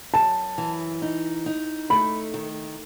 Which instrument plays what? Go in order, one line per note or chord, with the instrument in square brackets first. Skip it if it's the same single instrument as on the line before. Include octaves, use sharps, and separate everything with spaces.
[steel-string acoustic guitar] F#2 [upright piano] A5
[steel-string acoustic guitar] E3
D#4
D#4
[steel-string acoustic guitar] A3 [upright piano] B5
[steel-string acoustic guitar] D#3